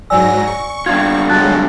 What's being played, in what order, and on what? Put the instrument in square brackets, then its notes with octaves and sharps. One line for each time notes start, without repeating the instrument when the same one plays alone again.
[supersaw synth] G#2 F#3 A#6 [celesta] D5 G#5 E6
[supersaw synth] C#6
[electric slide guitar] G3 D4 F4 [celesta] G#6
[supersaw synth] F#3 G#3 [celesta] A5 F#6 A6